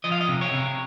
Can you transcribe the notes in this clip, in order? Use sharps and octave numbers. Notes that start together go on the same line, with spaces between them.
F3 D#5
F5
D#5
C3
C#5
C3